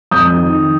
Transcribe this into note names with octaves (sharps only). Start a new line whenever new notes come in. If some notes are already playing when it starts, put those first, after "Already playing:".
F2 D#6 G6
D#3